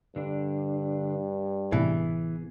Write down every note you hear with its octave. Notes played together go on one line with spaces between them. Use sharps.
G2 D3 D4
G1 A2 C3 E3 B3 G#4